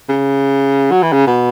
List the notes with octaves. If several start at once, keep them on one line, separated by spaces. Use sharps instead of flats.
C#3
F#3
E3
C#3
B2